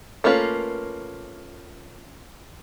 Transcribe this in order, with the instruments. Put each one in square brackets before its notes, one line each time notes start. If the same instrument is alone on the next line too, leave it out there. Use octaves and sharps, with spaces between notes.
[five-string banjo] A3 A#3 C#4 F4 B4